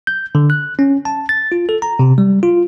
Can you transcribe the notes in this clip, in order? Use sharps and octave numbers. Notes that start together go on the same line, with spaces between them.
G6
D3
F#6
C#4
A5
A6
F4
A4
A#5
C3
G3
F4